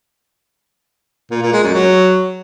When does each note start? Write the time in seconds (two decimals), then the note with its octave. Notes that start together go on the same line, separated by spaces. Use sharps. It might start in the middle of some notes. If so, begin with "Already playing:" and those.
1.31 A#2
1.42 A#2
1.53 G#3
1.63 F#2
1.74 F#3